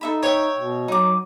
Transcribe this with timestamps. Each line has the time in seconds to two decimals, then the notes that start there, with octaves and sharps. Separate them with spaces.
0.01 D#4 A4 E5 B5
0.23 C#5 E5 G5
0.58 B2
0.88 F#3 D#4 D6